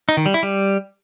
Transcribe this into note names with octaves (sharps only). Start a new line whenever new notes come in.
D#4
D#3
G3
E4
G3